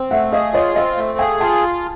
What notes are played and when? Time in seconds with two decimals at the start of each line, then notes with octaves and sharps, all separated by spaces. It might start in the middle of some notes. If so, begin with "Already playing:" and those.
Already playing: C4
0.11 A3 E5 F#5
0.32 G#4 D#5 F5
0.53 F4 C#5 D#5
0.75 C4 D#5 F5
0.97 A3
1.18 G#4 F5 G5
1.40 F4 G5 A5